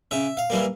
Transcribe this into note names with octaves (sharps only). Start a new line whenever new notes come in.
C#3 E5
F5
E3 G3 A#3